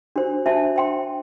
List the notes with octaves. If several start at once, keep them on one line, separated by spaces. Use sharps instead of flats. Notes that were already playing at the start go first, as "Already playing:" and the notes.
D4 F#4 C5
D4 F#4 C5 E5 A5
C5 G5 C6